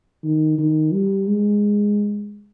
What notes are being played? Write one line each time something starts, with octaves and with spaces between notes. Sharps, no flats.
D#3
D#3
G3
G#3